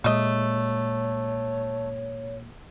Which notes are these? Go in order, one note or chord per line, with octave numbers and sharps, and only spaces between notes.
A#2 G#3 A3 C#5 D#5